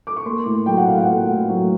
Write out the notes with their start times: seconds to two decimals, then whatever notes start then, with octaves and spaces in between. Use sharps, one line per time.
0.07 D6
0.16 C#6
0.25 A#3 C6
0.46 A2
0.66 F#3 G5
0.78 F#5
0.87 A2 F5
0.99 F#5
1.07 A#3
1.28 A2
1.49 F#3